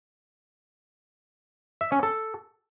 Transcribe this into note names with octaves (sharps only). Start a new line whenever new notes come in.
E5
C#4
A4